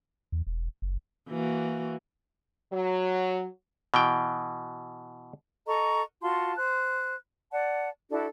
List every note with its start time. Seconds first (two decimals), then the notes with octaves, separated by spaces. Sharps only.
0.32 E2
0.47 E1
0.82 F#1
1.28 E3 A#3 F#4
2.73 F#3
3.94 B2 E3 G5
5.67 A4 D#5 A#5 C#6
6.21 F4 F#4 A5 C6
6.56 C5 F#6
7.51 D5 F#5 A5
8.10 D4 E4 F#4 A4